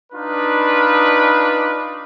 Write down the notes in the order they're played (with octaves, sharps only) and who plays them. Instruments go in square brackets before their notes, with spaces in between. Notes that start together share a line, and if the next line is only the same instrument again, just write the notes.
[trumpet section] D4 D#4 F4 B4